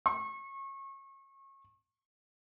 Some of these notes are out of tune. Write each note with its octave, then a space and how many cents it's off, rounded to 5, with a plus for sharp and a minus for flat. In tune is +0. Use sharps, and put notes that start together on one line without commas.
C#6 -35